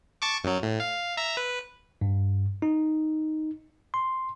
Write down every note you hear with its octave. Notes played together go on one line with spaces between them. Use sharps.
A5 C#6 D6
F#2 F#3
A2
F5
E5 A#5
B4
G2
D#4
C6